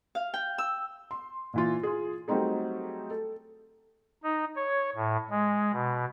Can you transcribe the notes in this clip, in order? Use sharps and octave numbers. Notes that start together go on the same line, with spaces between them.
F5
G5
E6
C6
A#2 E3 F4
F4 G#4
F#3 G3 A3 C4 D#4 G#4
A4
D#4
C#5
A2
G#3
B2